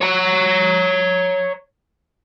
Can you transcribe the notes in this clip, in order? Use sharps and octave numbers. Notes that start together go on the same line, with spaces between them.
C#5 A#5